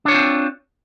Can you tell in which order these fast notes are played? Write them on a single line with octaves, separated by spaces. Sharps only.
D4 C#5 F4 C4